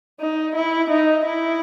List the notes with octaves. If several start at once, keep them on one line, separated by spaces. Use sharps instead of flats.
D#4
E4
D#4
E4